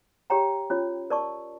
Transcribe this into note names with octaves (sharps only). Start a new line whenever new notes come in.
G4 C#5 G5 A#5
C#4 F4 C#5
A#4 D5 A5 C#6